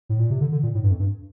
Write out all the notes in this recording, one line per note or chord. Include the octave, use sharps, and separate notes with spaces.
A2
A#2
C3
D3
D3
A#2
A2
G2
F2
G2